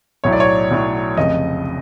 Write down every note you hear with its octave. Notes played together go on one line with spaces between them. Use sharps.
B1 A2 F#3 C#5
D5
C#5
B1 A2 F#3
F1 F2 C#3 D#5